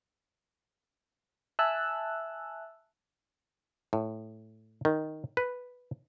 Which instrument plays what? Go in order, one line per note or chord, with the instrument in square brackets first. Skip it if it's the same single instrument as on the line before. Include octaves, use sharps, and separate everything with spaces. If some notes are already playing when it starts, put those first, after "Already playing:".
[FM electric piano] E5 G#5 A5 E6 F#6
[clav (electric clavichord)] A2
D#3
B4